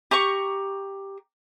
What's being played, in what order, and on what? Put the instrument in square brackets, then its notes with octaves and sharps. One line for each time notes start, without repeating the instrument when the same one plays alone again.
[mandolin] G4 A#5 C#6